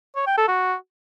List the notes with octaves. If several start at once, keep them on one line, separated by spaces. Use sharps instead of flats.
C#5
G5
A4
F#4